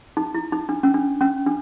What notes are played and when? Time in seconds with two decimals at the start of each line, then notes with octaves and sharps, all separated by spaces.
0.17 D#4
0.35 E4
0.52 D#4
0.69 D4
0.83 C#4
0.94 D4
1.21 C#4
1.47 D4